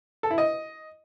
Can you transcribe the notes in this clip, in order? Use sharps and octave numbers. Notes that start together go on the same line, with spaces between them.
A4
E4
D#5